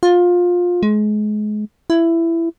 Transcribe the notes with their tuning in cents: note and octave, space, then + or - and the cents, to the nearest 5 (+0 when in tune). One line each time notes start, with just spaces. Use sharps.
F4 +20
G#3 +30
E4 +15